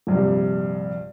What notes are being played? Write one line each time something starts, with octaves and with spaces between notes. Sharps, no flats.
A#1 G2 C3